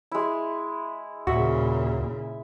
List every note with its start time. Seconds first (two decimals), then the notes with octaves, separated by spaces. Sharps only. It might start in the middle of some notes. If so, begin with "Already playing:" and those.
0.12 G#3 E4
1.27 D#2 A#2 C#3 F#4 E5